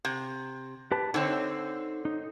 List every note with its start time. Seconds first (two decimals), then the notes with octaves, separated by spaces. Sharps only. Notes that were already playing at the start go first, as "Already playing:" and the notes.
0.05 C3
0.92 G4 B4 A5
1.14 D3 C4 D#4 C#5
2.05 D#4